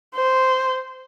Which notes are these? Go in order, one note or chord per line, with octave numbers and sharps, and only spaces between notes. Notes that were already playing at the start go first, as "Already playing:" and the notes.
C5